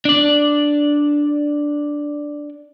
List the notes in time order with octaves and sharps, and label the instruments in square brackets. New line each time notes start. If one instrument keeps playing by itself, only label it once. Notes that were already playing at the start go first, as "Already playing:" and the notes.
[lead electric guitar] D4 D5